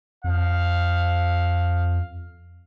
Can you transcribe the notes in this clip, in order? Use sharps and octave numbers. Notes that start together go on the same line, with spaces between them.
F2 F5